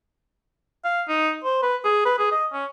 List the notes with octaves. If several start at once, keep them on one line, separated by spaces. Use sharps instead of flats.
F5
D#4
C5
B4
G#4
B4
G#4
D#5
C#4